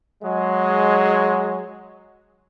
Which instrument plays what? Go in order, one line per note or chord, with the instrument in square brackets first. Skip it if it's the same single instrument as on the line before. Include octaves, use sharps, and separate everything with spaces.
[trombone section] F#3 G#3